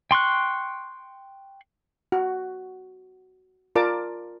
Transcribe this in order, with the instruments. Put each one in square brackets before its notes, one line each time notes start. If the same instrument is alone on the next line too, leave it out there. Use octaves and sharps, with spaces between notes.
[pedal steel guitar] G5 C6 C#6 F#6
[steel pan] F#4
F4 A#4 D5 A5 D6